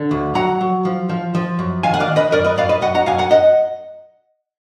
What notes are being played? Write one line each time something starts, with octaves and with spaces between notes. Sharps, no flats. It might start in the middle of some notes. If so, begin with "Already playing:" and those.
Already playing: D3
D2
F#3 F#5 A#5
F#3
F3
F3
F3
F#2
D#3 F5 G#5
F#5
D5 F5
D#3
B4 D#5
F#2 A#4 D5
B4 D#5
F#2 D5 F5
B4 D#5
F#2 D#5 F#5
F#5 A#5
F#2 F5 G#5
F#5 A#5
D#5 F#5